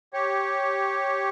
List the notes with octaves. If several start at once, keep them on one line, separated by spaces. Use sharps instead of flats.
G4 C#5